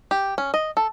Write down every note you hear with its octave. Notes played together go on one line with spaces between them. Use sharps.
G4
C#4
D#5
A4